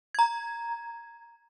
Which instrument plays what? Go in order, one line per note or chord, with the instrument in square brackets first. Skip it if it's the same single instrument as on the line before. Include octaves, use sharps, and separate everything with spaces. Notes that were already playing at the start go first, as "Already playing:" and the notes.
[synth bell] A#5 G#6